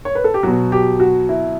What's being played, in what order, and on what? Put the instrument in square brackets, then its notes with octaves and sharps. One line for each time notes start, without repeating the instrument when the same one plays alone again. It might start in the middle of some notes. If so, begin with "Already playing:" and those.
[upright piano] C#5
B4
A4
G4
B2 F#3 F#4
G4
F#4
E4